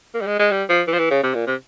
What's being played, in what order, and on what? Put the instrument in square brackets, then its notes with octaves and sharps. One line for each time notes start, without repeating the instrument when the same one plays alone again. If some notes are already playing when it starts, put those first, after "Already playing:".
[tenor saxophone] A#3
G3
G#3
G#3
G3
F3
E3
F3
E3
C#3
C3
A#2
C3